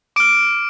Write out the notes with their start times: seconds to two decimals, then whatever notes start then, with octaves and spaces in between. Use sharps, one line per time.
0.16 D6 F6 D7